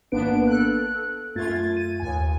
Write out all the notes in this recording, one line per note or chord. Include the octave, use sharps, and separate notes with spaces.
G#1 A#3 B3 D4 B4 D7
A4 F#6
F#2 A3 F4 G#6 A6
D#7
D#2 G#5